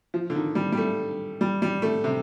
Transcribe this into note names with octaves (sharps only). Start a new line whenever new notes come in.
F3
D3
D#3
G3
G3
A3
G3
G3
A3
C3